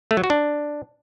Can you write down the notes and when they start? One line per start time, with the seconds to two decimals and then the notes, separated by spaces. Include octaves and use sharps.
0.11 A3
0.17 F#3
0.24 F#4
0.30 D4